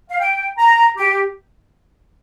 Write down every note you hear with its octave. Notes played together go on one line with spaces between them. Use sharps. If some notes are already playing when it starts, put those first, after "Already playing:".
F5
G5
A#5
G4